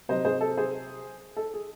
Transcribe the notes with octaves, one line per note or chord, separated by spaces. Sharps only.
C3 F#3 C5 D#5
G#4 C5
A4
G#4 C5
A4
G#4